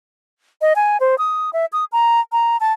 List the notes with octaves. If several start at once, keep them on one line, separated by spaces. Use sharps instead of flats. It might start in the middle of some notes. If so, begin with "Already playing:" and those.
D#5
G#5
C5
D#6
E5
D#6
A#5
A#5
A5